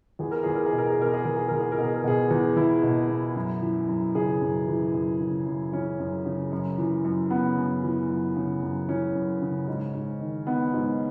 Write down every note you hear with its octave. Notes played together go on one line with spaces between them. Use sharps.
E2 G#4
A#4
E2 G#4
A#4
G#4
B2
A#4
G#4
B2 A#4
G#4
E2 A#4
G#4
E2 A#4
G#4
A#4
B2
G#4
A#4
B2 G#4
E2
E2 E4
B2
B2
F#2
E3
F#2
C#3 G#4
F#2
E3
F#2
C#3
F#2
E3 C#4
F#2
C#3
F#2
E3
F#2
C#3 B3
F#2
E3
F#2
C#3
F#2
E3 C#4
F#2
C#3
G#2
G#2
D#3
D#3 B3
G#2